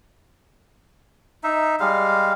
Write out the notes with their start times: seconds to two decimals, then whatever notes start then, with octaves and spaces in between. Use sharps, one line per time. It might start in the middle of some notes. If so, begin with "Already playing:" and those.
1.44 D#4 E5
1.80 G3 G#3 F5